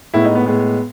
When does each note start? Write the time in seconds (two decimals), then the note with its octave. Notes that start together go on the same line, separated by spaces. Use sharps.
0.13 A2 G#3 B3 E4
0.24 D#4
0.35 B3
0.46 A2 G#3 B3